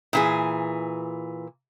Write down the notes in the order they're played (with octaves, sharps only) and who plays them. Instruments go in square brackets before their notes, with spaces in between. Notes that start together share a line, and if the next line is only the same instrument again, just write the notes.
[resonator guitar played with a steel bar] A#2 E3 G#4